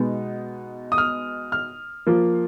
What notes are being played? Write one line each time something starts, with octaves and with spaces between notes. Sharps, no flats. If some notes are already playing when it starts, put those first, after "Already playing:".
Already playing: B2 G#3 B3 D#4
D#6
F6
F6
F3 A#3 F4